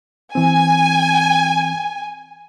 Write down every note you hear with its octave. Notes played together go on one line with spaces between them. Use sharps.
E3 C4 G#5